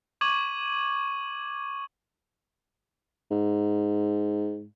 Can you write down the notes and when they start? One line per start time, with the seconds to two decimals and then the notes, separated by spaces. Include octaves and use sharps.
0.21 C#6 D6 G#6 D#7 F#7
3.31 G#2